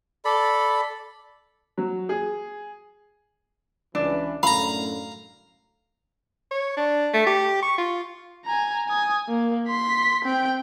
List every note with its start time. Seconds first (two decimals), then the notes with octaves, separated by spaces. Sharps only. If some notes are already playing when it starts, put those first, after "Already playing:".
0.25 A4 D5 B5
1.78 F#3
2.09 G#4
3.95 C#2 E3 D4
4.43 F#2 A2 D3 F5 A#5 B5
6.51 C#5
6.77 D4
7.14 A3
7.26 G4
7.62 C#6
7.78 F4
8.45 G#5 A#5
8.88 G#5 D#6
9.29 A#3
9.67 C6 B6
10.25 C4 G5